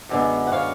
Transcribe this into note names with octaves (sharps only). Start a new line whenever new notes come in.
F#2 D3 F3 G#3 B3
F#5
C#5 F5